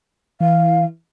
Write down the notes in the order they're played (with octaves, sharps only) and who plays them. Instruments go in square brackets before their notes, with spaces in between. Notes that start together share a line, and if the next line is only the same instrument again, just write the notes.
[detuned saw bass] E3 [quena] F5